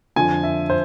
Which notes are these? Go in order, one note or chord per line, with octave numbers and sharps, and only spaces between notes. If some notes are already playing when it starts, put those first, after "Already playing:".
F2 D3 F3 G#5
E5
C5